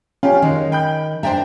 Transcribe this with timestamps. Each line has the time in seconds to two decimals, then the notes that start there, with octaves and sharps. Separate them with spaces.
0.23 C#4 F4 G4
0.42 D#3 G#3
0.72 G5 B5 G6
1.23 D4 C5 D5 E5 G5 A#5